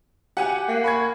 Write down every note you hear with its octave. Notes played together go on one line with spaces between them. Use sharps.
G4 F#5 G#5 F#6
A#3
B5 C#6 G#6